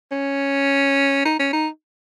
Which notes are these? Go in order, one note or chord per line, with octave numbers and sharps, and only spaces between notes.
C#4
D#4
C#4
D#4